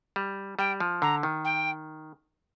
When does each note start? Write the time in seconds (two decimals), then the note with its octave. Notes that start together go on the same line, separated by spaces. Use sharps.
0.16 G3
0.59 G3 G5
0.80 F3
1.02 D3 A#5
1.23 D#3
1.45 G5